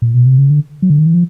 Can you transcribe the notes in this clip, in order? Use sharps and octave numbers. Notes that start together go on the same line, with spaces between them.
A#2
B2
C3
C#3
D3
F#3
D3
D#3
E3
F3